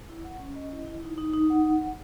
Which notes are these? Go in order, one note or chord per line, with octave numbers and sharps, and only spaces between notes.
E4
F#5
C#4
D#5
E4
E4
D#4
D#4
D#4
F#5